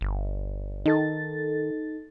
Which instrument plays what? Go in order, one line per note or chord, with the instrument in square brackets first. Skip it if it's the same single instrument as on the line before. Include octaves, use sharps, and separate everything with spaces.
[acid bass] G1
[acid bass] D#3 [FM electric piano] D#4 A4 A6